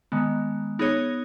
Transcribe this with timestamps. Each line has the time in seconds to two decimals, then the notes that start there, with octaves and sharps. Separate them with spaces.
0.12 D#3 G#3 B3
0.79 B3 D#4 G#4 C#5